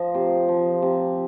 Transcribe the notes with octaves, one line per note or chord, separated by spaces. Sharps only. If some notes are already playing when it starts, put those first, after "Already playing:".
Already playing: F3 C5 D#5
C3
F3
C3